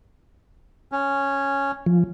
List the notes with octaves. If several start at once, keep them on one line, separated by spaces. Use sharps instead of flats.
C#4
F3